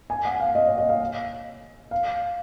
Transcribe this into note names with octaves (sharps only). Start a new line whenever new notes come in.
G#5
F#5
F5
D#5
C#5
D#5
F5
F5